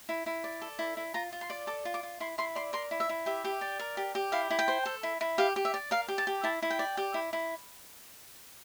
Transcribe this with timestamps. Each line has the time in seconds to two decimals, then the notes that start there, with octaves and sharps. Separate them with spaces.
0.09 E4
0.26 E4
0.44 D5
0.62 A4
0.79 E4
0.97 E4
1.14 F4 A#5
1.33 F4
1.41 C6
1.50 D5
1.67 A4 D6
1.85 F4
1.94 D6
2.03 F4
2.20 E4 C6
2.38 E4 C6
2.55 D5 C6
2.73 A#4 C6
2.91 E4
3.00 E5
3.09 E4
3.26 G4 E5
3.44 G4
3.61 D5
3.79 A#4
3.97 G4
4.15 G4
4.32 E4 F5
4.50 E4
4.59 G5
4.68 C5
4.86 A4
5.03 E4
5.21 E4
5.38 G4 F5
5.56 G4
5.65 E5
5.74 D5
5.91 A#4 F5
6.08 G4
6.18 A5
6.27 G4
6.44 E4 A5
6.62 E4
6.70 G5
6.79 D5
6.97 G4
7.14 E4
7.33 E4